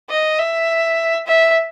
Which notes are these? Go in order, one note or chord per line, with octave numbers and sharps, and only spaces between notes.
D#5
E5
E5